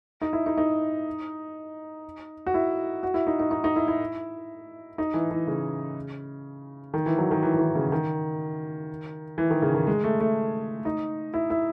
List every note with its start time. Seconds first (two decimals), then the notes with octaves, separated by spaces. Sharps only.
0.22 D#4
0.33 E4
0.46 D#4
0.57 D#4
2.46 F#4
2.54 E4
3.03 F#4
3.14 E4
3.27 D#4
3.40 D#4
3.51 D#4
3.64 D#4
3.76 E4
3.88 E4
4.98 D#4
5.14 E3
5.31 E3
5.47 C#3
6.94 D#3
7.06 E3
7.18 F#3
7.31 D#3
7.43 E3
7.54 E3
7.59 D#3
7.75 C#3
7.92 D#3
9.38 E3
9.51 D#3
9.62 C#3
9.74 D#3
9.87 G#3
10.04 A3
10.20 A3
10.85 D#4
11.34 E4
11.50 E4